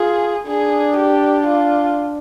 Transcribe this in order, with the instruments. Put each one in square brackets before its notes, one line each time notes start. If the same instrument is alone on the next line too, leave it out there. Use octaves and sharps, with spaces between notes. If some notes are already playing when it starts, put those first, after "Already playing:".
Already playing: [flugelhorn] F4 [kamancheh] G#4
[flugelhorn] D4 [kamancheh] G#4
[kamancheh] G4
F4